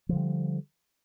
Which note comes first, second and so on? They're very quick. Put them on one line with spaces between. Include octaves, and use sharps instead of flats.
F3 D3 G3